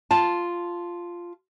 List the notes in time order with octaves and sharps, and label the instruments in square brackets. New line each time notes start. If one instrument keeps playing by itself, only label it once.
[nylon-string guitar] F4 A5